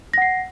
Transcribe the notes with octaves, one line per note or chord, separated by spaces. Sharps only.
F#5 A#6 C7